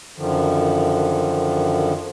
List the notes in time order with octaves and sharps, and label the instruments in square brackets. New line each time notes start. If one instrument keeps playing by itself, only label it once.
[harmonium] F#2 D3 D#3 F3